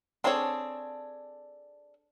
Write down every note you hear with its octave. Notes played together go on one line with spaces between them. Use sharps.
C4 D4 G#4 A4 C#5